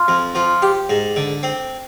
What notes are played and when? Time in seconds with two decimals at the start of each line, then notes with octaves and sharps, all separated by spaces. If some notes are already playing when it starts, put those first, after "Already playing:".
Already playing: F4
0.08 F2
0.35 F3 F4
0.62 G4
0.89 G#2
1.16 D3
1.43 C4